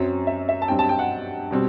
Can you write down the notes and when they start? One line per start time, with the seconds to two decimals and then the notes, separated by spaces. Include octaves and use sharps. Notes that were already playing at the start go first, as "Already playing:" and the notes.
Already playing: F#2 F#3 C4
0.27 E5
0.49 E5
0.62 A5
0.68 G2 F#3 C4 G5
0.79 A5
0.89 G5
0.99 F#5
1.51 B2 G3 C4